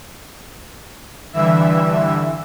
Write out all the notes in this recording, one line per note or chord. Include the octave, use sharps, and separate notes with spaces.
G2 D3 E3 E5 E6